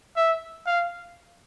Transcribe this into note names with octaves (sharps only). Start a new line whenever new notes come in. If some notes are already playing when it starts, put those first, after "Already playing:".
E5
F5